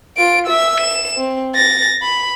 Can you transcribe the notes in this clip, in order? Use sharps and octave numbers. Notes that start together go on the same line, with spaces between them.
F4 D7
E5 E6
E7
C4
A6 A#6
B5